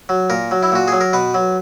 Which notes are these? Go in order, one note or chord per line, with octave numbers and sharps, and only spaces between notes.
F#3
A#2 A#4
F#3
E4
A#2 F#4
F#3 G#4
A#4
B2 B4
F#3